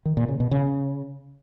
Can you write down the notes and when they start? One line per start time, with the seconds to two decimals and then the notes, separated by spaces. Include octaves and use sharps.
0.05 D#3
0.17 A#2
0.28 C#3
0.40 B2
0.51 C#3